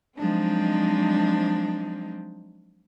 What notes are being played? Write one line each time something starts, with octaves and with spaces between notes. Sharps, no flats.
F3 F#3 G#3 C4 D4 D#4